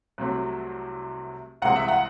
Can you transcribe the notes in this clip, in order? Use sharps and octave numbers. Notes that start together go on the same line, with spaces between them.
C2 C3 F#3 A3 C4
C2 C3 E3 G#3 C4 F#5
E5
F#5